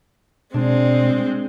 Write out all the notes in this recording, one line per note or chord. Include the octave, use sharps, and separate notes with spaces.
B2 G#3 C4 D4